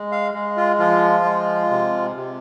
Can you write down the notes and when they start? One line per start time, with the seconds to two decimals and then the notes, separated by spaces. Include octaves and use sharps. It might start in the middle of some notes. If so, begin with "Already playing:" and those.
Already playing: G#3
0.12 F5
0.34 G#3
0.57 F4
0.79 F3 F4
1.24 G#3
1.70 C3
2.16 C3